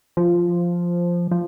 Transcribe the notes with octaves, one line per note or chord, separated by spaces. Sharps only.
F3
F3